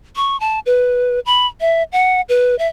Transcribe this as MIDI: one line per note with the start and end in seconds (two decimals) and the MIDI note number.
0.16 0.39 85
0.40 0.59 81
0.66 1.20 71
1.26 1.47 83
1.61 1.83 76
1.92 2.21 78
2.29 2.58 71
2.59 2.68 76